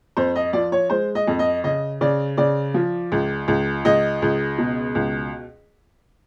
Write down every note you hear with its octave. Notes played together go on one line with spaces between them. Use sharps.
F2 C5
D#5
F3 D5
C#5
G#3 C5
D#5
F2
D#5
C#3 D#5
C#3 D5
C#3 D5
F3
C#2
C#2
C#2 D#5
C#2
B2
C#2